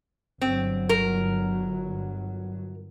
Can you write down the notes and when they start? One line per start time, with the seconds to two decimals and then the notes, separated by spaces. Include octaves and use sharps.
0.41 G1 F#3 C4
0.89 A#4